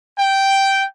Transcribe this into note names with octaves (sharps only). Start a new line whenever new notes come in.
G5